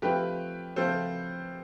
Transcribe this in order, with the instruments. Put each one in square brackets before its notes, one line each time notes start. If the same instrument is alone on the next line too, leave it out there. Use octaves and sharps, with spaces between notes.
[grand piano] F3 A3 C4 F4 [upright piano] G4 B4
[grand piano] F3 A3 C4 F4 [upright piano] A4 C5